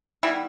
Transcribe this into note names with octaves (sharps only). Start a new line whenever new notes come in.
D#3 E3 G3 B3 E4